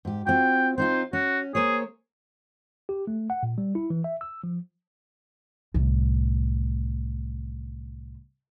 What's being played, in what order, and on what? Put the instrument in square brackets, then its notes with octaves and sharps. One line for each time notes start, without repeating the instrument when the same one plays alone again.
[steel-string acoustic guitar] G#2 G4
[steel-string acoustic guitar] C4 F4 F#4 [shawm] G5
[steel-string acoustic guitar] C4 D#4 F4 [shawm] C5
[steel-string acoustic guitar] C#4 [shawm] F#4
[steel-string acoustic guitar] A#3 C5 C#5 [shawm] G#4
[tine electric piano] G4
A3
F#5
A#2
G3
E4
E3
E5
E6
F3
[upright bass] C2 A2